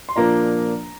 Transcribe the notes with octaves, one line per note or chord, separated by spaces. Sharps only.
C6
A#2 F3 A#3 D4 A#5